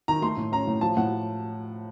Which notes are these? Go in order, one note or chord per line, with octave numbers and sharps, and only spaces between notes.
D#3 A#5
A3 C6
A2
C#4 A#5
A2
F3 A5
A2 F#5